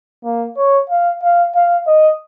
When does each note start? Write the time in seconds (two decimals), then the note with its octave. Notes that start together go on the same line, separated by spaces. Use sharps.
0.24 A#3
0.57 C#5
0.90 F5
1.23 F5
1.55 F5
1.87 D#5